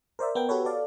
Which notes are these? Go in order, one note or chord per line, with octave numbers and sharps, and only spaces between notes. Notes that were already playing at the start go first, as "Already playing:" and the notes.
A#4 C5 D5 E5
B3 A#4 G5
F#4 G4 A4 B4 C#5
A4 D5 F5